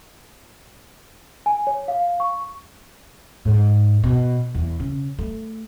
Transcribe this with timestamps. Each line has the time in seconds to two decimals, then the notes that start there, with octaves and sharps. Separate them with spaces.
1.46 G#5
1.67 C#5
1.88 F5
2.20 C#6
3.45 G#2
4.04 B2
4.55 E2
4.80 C#3
5.19 A3